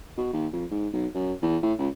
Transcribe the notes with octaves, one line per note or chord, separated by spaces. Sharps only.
B2
D#2
F2
G#2
B1
F#2
E2
A2
C#2